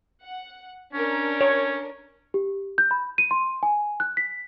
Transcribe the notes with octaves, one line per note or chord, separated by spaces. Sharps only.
F#5
C#4 D4 A#4
C#5
G4
G6
B5
D#7
C6
G#5
F#6
B6